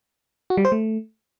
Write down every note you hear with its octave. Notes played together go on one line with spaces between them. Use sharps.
F#4
G3
C5
A3